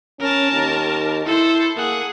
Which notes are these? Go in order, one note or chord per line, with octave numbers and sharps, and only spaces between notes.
C#4 A#4 A5
D#2
E4 A4 C5
A#3 G#4 F#5